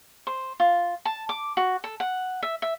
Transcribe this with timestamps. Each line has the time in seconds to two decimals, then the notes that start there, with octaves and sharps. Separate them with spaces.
0.27 C5
0.60 F4
1.05 A5
1.29 D6
1.57 F#4
1.84 A4
2.00 F#5
2.43 E5
2.62 E5